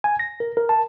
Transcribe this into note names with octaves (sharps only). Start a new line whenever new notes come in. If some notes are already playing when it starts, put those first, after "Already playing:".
G#5
A#6
A#4
A#4
A5